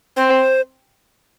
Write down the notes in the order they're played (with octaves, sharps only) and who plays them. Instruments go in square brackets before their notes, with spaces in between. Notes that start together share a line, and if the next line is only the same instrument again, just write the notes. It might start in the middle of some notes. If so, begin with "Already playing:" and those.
[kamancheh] C4 [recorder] C5